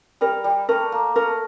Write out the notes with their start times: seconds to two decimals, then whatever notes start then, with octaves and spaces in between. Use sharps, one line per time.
0.21 G3 A#4
0.44 G3
0.69 A3 A#4
0.92 A#3
1.15 A3 A#4